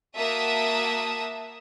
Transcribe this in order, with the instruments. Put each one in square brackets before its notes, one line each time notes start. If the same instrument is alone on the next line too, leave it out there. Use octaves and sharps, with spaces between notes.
[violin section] A#3 F#4 E5 A5 D#6